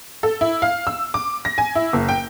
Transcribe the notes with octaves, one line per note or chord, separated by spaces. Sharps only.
A4
E4
F5
E6
D6
A#6
G#5
E4
F#1
G5